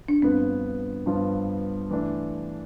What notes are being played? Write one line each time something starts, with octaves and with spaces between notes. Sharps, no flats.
D4
G2 F3 B3 C4
G2 F3 B3
E3 A3 D4